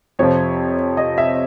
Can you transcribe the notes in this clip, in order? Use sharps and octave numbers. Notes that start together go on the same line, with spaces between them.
F2 C3 F3 C#5
D#5
E5